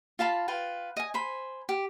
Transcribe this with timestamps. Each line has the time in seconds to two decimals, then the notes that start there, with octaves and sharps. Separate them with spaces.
0.19 F4 F5 A5 B5
0.48 F4 B4 G5
0.97 D#5 G#5
1.14 C5 G#5 B5
1.69 G4